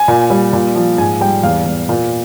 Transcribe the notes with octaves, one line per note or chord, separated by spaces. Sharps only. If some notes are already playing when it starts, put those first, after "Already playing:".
Already playing: G#5
A#2
G3
A#2
F3
G#2 G#5
G3 G5
E2 F5
E2
A#2